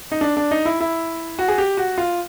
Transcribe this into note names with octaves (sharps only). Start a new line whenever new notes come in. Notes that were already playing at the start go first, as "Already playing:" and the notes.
D#4
D4
D4
D#4
E4
E4
F#4
G#4
G4
F#4
F4